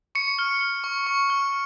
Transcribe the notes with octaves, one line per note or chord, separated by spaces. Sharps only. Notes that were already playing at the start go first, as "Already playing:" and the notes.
C#6 C#7
F6
F6
C#6
C#6
F6